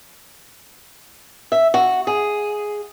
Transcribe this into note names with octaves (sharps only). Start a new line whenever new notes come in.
E5
F#4
G#4